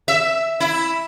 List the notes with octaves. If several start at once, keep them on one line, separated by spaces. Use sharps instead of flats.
E5
E4